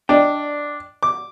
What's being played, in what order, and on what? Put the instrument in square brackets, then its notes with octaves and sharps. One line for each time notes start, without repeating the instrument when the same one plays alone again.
[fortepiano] D4 [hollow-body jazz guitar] D5 D#5 G5
[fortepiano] D6